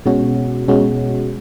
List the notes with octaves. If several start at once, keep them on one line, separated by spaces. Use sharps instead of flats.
B2 G#3 C#4 F#4
B2 G#3 C#4 F#4